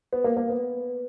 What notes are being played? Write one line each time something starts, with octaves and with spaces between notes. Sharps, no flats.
B3
A#3
A#3
B3